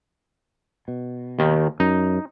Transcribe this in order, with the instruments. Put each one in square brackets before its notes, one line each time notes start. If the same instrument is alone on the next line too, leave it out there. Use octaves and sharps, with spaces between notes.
[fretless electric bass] B2
[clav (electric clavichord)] D#2 D#3
[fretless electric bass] F#2 [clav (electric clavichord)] D#4